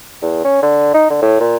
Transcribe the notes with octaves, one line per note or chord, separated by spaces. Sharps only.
E2
C#4
D3
D#4
D3
A2
A#2